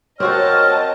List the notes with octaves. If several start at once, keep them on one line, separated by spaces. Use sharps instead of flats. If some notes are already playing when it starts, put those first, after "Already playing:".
C4 F#4 A#4 C5 C#5 D#5 A5 F6